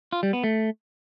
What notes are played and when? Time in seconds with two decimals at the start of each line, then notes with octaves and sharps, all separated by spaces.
0.13 F4
0.23 G3
0.33 B3
0.44 A3